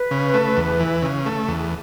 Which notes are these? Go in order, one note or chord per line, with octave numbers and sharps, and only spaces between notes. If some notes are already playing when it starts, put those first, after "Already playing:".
Already playing: B4
C#3
A3
E2
E3
C#3
A3
E2